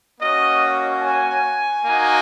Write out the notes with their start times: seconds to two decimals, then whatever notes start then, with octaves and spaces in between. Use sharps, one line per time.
0.20 A#3 C#4 F#4 D#5
1.02 G#5
1.85 A#3 D#4 F#4